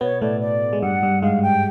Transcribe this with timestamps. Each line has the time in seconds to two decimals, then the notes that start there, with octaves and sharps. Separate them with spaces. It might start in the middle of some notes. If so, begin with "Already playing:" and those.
0.01 B2 B3 C#5
0.22 A2 A3 D5
0.41 D5
0.73 G#3
0.82 G2 G3 F#5
1.03 G2 G3
1.22 G#2 G#3 F5
1.43 G5